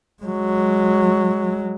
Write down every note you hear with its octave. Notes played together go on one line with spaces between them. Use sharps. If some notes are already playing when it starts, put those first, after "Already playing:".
F#3 G#3